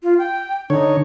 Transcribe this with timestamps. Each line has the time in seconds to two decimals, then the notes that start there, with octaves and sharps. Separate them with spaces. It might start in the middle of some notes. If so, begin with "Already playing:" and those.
0.03 F4
0.19 G5
0.70 D3 D#4 C#5